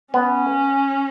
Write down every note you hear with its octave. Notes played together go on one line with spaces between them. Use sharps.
B3 C#4